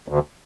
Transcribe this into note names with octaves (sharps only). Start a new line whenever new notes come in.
D2